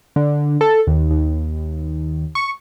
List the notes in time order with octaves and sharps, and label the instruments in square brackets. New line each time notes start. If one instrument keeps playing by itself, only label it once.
[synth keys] D3
A4
D#2
D#2
C#6